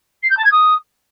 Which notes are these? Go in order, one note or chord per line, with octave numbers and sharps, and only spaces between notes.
C7
G6
A5
G#6
D#6